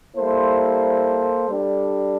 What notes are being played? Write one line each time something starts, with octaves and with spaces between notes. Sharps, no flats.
G3 A#3 E4 A4 C5
G3 D4 A4